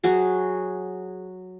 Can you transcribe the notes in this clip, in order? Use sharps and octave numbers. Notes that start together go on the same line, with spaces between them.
F#3 F#4 G#4